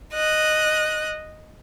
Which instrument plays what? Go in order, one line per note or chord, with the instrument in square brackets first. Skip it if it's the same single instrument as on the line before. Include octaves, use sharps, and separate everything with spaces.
[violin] D#5 F#6